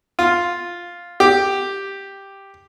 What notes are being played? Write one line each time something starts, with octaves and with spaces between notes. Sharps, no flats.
F4
G4